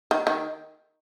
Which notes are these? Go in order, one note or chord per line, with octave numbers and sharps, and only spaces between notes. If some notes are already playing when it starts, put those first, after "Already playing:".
D#3
D#3